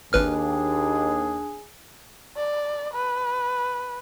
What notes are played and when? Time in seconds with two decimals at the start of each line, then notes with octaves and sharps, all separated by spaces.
0.13 G#1 D#2 D4 G#4 B4 F6
2.37 D5
2.94 B4